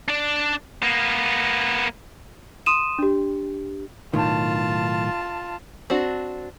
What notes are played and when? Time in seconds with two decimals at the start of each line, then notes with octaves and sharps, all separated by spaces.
0.08 D4 D5
0.83 A#3 B3
2.66 C6 D#6 D#7 E7
2.99 D4 G4
4.14 B1 A2 D#3 F4 A5
5.90 C4 D4 F#4